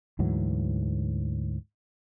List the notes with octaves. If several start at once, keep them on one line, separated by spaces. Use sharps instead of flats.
D2 G#2 E3 F#3